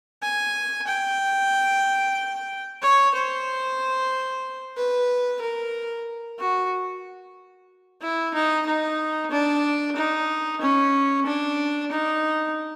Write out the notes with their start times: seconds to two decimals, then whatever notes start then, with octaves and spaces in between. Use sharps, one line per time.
0.22 G#5
0.87 G5
2.82 C#5
3.15 C5
4.77 B4
5.41 A#4
6.39 F#4
8.01 E4
8.35 D#4
8.66 D#4
9.31 D4
9.96 D#4
10.61 C#4
11.26 D4
11.92 D#4